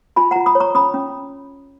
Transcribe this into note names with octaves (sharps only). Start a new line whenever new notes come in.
F4 G#5 B5
F4 F#5 A#5
B5 D#6
C#5
A#5 C#6
C#4 B5 D#6
C#4